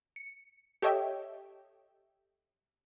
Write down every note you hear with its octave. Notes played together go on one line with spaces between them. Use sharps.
C#7
G4 A4 C#5 D#5 E5 G5